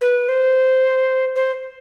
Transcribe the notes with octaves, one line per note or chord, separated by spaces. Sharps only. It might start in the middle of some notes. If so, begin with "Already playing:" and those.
B4
C5
C5